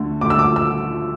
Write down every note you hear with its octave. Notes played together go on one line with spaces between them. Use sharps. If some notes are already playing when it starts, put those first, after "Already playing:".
Already playing: D2 D3 A3
D2 D3 A3 D6
E6
D6
E6